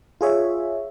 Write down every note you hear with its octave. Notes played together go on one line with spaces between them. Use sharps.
F4 G#4 C#5 E5